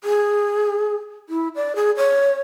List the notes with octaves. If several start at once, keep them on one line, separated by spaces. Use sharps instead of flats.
G#4
E4
D5
G#4
C#5